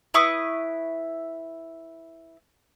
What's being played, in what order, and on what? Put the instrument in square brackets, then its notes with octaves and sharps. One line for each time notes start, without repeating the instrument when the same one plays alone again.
[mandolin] E4 B4 C#6 D#6